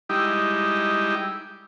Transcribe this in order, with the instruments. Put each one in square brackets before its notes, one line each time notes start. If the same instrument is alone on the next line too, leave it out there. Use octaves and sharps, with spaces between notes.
[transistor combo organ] G3 G#3 D#4 E4 G4